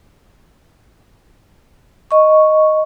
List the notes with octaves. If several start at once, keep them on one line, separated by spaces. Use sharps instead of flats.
D#5 C#6